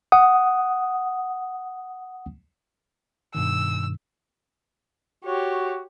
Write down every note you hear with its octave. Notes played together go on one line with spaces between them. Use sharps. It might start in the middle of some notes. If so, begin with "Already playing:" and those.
F#5 D#6
G2 B2 D#3 E6
F#4 G4 C#5